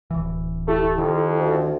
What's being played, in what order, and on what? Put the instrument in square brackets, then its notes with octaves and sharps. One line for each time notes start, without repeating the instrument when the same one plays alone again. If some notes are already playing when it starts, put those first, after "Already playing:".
[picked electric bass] D1 E3
[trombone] A3 [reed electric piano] E4 G4 A4
[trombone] F2 [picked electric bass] D#3
[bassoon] D2